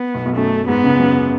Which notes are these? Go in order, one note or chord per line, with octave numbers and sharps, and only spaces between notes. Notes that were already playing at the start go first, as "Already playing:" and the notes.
Already playing: B3
B1 B2
B1 B2
F#2 F#3 A3
G#2 G#3 B3
C#2 C#3
F#2 F#3